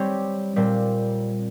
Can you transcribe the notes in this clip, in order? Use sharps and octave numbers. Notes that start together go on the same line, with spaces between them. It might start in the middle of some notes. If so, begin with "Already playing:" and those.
Already playing: G3 C4 G4 C#5
A#2 G3 C4